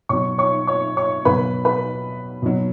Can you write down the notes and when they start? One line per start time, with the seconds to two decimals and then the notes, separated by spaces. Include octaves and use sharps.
0.09 B2 F#3 C#5 C#6
0.38 C#5 C#6
0.67 C#5 C#6
0.97 C#5 C#6
1.25 B2 F#3 B4 B5
1.65 B4 B5
2.42 B2 F#3